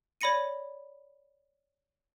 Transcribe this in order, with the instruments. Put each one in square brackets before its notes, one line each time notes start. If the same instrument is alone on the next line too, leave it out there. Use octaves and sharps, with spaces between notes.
[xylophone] C#5 D5 B5 A#6 C#7 D#7